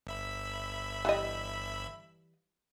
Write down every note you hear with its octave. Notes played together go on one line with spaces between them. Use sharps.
G1 E5 B5
E3 G3 D#5